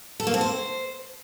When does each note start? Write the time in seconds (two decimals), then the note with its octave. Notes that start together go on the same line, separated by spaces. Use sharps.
0.20 A4
0.27 A#3
0.34 C4
0.41 C5